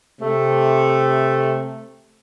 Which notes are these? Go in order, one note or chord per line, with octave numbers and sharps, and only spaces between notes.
C3 A3